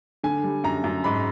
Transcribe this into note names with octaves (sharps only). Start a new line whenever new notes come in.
D3 G#5
G3
F#2 A#5
F#2
G#2 B5